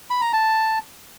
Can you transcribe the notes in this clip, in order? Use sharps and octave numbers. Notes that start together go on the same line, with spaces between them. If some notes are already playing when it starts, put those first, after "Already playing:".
B5
A#5
A5